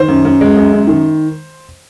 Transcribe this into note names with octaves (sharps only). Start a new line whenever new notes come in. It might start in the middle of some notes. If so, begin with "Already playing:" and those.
Already playing: D#3 C5
F#2
F#2
G#3
F#2
F#2
D#3